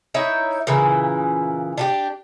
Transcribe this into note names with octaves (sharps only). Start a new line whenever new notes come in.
D#4 E4 C#5 E5
A#2 C#3 E3 E4
D4 F#4 G4